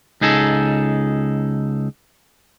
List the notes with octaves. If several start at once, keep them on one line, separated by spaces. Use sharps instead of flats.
C#2 D#4 G#4 A4